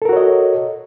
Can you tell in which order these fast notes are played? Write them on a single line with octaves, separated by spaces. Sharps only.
A4 A#4 F#4 C#5 D#5